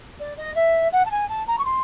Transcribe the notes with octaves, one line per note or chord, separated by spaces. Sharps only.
D5
D#5
E5
F#5
A5
G#5
A5
A#5
C#6
C6